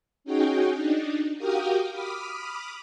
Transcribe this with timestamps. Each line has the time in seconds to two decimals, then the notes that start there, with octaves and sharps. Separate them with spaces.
0.24 C#4 D#4 F#4 G#4 G5
0.73 D4 D#4
1.38 F#4 G4 A#4 F5 G5 D#6
1.91 B5 D6 D#6 F6